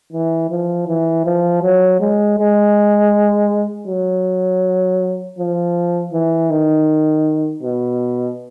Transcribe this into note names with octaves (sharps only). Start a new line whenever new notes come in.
E3
F3
E3
F3
F#3
G#3
G#3
F#3
F3
E3
D#3
B2